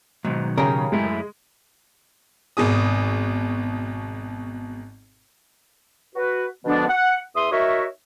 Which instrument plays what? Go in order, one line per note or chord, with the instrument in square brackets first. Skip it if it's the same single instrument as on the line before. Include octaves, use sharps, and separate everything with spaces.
[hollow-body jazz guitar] G#2 [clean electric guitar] B2 D#3 F#3
[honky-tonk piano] C#3 [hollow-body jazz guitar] G4 G#4 A#4
[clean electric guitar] F#2 A3 E4 [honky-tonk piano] G#3
[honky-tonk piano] G#1 B2 G#4 D#6
[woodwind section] F#4 B4
B2 D3 F3 G#3 B3 D4
F#5
E2 E5 C6 D#6
D#4 F#4 A#4 C#5 E5